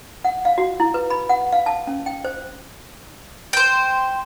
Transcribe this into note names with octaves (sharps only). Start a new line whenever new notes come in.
F#5
F5
F#4
E4
B4
B5
F#5
F5
A5
C#4
G5
C5
C5 G5